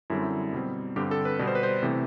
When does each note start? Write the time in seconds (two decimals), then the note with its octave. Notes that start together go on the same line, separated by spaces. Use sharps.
0.10 F#2 D3 G3 C4 E4
0.53 B2 G3 C4
0.96 G2 D3 G3 C4 G4
1.11 A4
1.25 B4
1.39 B2 G3 B3 D5
1.47 C5
1.55 B4
1.63 C5
1.83 C3 E3 A3 C4